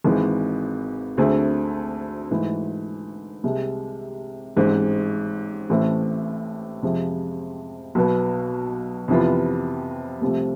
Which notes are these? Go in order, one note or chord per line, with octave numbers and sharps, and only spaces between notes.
G#1 G#2 E3 G#3
D2 D3 A3 C4 G#4
G#2 E3 A3
C2 C3 G#3
A1 G#2 G#3 C4
A1 A2 E3 A3 C4
F2 C3 F3 G#3
B1 B2 B3
F2 C3 E3 B3 F4
C2 C3 F3 A3